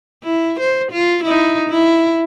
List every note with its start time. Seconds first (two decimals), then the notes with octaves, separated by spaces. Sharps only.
0.24 E4
0.60 C5
0.93 F4
1.24 D#4 E4
1.70 E4